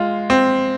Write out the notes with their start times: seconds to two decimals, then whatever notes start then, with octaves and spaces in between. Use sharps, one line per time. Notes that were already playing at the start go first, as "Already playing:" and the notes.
Already playing: G#3 F4
0.30 C4